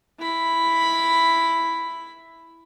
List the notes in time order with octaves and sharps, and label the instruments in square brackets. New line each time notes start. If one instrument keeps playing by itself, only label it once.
[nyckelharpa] E4 B5